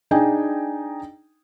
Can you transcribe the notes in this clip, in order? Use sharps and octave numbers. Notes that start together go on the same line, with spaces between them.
D4 D#4 G#4 G5 G#5